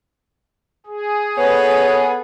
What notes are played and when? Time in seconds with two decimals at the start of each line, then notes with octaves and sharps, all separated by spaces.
0.86 G#4
1.38 B3 A4 B4 C#5